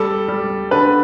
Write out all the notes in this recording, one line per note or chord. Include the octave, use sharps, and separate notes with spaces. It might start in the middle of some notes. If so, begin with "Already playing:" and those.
Already playing: G3 A4
G3
D3 B4